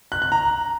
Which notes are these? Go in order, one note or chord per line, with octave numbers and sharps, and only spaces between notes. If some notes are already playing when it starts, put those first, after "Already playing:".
F#6
F#6
A#5